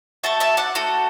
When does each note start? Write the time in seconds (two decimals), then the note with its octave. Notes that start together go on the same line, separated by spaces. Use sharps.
0.23 A3 F#4 A4 E5 A5
0.40 E5 A5
0.57 D5 F#5
0.75 A3 F#4 A4